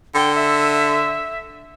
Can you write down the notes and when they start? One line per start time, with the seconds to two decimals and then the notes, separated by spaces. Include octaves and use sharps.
0.15 D3 G5
0.36 E5